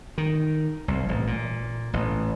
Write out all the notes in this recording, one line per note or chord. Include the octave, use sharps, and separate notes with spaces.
D#3
C2
A1
A#2
A1